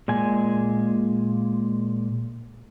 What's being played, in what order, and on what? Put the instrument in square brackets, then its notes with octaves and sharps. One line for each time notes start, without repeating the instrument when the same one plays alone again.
[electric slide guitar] A#2 G#3 G#5